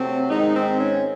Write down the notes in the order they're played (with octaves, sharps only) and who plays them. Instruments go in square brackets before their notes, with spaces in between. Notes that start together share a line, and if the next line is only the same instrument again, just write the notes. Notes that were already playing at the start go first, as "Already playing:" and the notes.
Already playing: [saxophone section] C3 F#3 A3 C4
G#2 D#3 G#3 D#4
C4
C#4